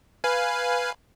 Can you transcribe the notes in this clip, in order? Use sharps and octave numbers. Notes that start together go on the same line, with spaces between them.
B4 F5 G#5